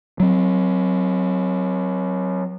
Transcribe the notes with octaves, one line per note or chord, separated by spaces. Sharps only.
F#3 C4